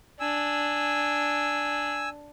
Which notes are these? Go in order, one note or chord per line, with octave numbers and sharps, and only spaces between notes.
D4 G#5 E6